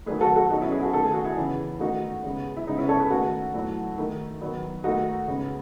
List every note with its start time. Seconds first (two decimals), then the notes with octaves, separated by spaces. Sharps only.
0.06 D#3 F#3 A3 G#4 B4
0.21 F#4 A4
0.36 F#4 A4
0.50 B2 F#3 B3 D#4 F#4
0.61 C#4 E4
0.72 G#4 B4
0.82 F#4 A4
0.93 D#3 A3 A4
1.03 G#4
1.13 F#4
1.24 E4 G#4
1.37 C#3 E3 B3
1.80 D#3 A3 D#4 F#4
2.24 C#3 G#3 B3
2.57 E4
2.67 C#3 G#3 B3 D#4
2.78 C#4 E4
2.89 A4 C#5
3.00 G#4 B4
3.10 D#3 A3 F#4 A4
3.53 A2 F#3 A3
3.98 D#3 A3
4.41 D#3 F#3 B3
4.84 D#3 A3 D#4 F#4
5.28 C#3 G#3 B3